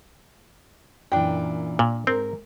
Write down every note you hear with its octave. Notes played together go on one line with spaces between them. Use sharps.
F#2 A#2 E3 D4 G5
A#2
G#2 C4 A#4